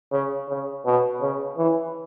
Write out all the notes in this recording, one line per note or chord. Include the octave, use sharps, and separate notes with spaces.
C#3
C#3
B2
C#3
E3